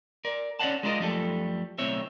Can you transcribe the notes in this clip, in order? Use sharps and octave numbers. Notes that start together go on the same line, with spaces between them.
A#4 D5
C#4 C#5 D5 F5 F#5 A5
G#3 D4 E4 F4 A#4 D#5
F#2 F3 G3 A3 A4
B1 A2 D3 C4 C#5 E5